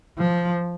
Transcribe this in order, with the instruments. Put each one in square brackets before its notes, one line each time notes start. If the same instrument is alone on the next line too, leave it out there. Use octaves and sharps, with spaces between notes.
[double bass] F3